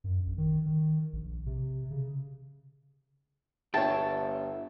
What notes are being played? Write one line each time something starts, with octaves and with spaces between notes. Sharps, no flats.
F#2
A#1
D#3
D#3
A#1
C3
C#3
G1 C#5 E5 G5 A5